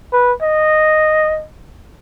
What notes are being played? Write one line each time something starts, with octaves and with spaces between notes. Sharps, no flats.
B4
D#5